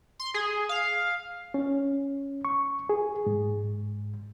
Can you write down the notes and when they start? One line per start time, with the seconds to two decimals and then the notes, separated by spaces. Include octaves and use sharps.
0.19 C6
0.34 G#4
0.69 F5
1.54 C#4
2.45 C#6
2.89 G#4
3.26 G#2